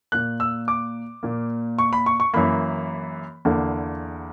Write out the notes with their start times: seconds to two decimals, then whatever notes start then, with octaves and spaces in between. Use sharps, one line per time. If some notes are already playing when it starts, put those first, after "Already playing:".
0.12 A#2 A#3 F#6
0.40 E6
0.68 D6
1.23 A#2 A#3
1.79 C#6
1.93 B5
2.06 C#6
2.20 C#6
2.33 F#2 E3 A#3 B5
3.45 E2 D3 A#3